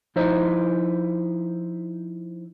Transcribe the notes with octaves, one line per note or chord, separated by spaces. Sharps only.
F3 D#4 E4 C5 D#5